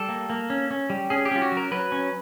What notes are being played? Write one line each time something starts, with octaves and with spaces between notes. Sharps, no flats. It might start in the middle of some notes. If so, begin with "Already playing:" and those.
Already playing: G3 A4
A#3
A#3
C#4
C#4
G3
C#4 G#4
G4
C#4 F4
F#4
F#3
A#4
F#3 B4
C#4